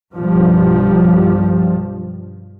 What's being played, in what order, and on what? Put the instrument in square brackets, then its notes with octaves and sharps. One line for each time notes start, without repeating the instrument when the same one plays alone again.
[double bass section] B1 G2 F3 G3